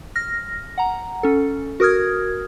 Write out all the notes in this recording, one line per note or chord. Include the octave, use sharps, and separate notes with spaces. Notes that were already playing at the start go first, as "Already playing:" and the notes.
F6 A#6
F#5 A#5
C#4 A4
F#4 A#4 D#6 F6 G#6